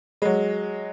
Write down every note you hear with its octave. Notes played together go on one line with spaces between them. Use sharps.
F#3 G#3